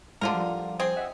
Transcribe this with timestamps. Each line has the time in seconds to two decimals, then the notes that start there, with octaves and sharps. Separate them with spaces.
0.21 A2 D3 G3 G#3 F4 A#4
0.34 F3 G3
0.80 C4 G#4
0.96 D#5 E5 F#5